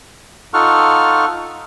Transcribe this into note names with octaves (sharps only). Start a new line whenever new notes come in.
D#4 F4 A4 F#5 C#6 F6